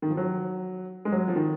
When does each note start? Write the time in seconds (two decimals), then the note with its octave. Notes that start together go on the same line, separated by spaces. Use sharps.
0.02 D#3
0.10 F3
0.17 F#3
1.05 G#3
1.12 F#3
1.28 F3
1.36 D#3